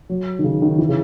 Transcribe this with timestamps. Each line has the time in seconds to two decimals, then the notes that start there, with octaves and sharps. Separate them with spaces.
0.09 F#3
0.39 D#3
0.44 C#3
0.62 D#3
0.78 E3
0.89 C#3